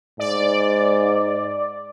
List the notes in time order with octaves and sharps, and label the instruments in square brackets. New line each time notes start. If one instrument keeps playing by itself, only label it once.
[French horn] G#2 [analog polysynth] D5